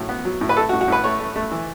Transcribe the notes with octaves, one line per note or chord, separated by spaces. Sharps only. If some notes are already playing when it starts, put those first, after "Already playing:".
Already playing: A2 F#3
B3
F#3
A2
B4
A3 A4
F#4
A2
F#4
A2 B4
A3 C#5
A3
A3
E3